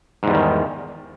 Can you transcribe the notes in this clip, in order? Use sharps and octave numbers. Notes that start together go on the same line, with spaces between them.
E2 G#2 D#3 G3